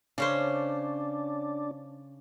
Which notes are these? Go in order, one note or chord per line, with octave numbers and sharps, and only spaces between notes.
C#3 C#4 D4 C5